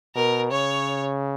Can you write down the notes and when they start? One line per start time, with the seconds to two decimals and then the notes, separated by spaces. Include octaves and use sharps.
0.15 B2 A#4
0.51 C#3 C#5